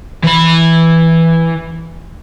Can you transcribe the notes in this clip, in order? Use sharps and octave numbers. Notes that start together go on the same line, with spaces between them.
E3 B5